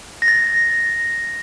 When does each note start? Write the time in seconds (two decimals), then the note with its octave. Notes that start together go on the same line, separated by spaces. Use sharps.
0.22 A#6
0.28 A6